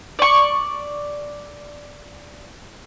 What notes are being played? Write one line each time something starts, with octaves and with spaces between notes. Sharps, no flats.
D5 C#6